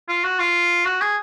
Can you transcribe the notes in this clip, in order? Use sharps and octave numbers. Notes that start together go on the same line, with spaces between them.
F4
F#4
F4
F#4
G#4